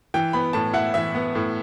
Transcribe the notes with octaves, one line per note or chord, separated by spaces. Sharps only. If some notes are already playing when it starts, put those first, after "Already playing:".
E3 G5
B3 B5
A2 A5
E4 F#5
E3 E5
B3
A2